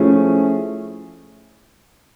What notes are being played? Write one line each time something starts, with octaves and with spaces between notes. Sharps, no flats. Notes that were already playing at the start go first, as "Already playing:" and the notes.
Already playing: F3 A3 C#4 E4 G#4